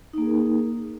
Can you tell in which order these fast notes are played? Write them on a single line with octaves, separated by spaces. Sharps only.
D#4 A#3 G#4 A#4